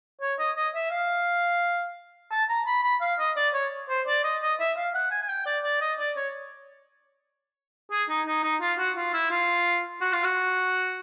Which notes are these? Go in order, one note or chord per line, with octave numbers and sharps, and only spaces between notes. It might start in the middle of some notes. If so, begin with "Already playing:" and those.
C#5
D#5
D#5
E5
F5
A5
A#5
B5
B5
F5
D#5
D5
C#5
C5
D5
D#5
D#5
E5
F5
F#5
G#5
G#5
G5
D5
D5
D#5
D5
C#5
G#4
D#4
D#4
D#4
F4
F#4
F4
E4
F4
F#4
F4
F#4